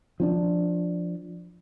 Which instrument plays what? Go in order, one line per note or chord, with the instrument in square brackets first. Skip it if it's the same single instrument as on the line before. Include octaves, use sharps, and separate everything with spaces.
[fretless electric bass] F3 C#4 D4